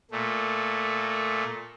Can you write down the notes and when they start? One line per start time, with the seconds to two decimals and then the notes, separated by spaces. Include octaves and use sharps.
0.11 A#2 A3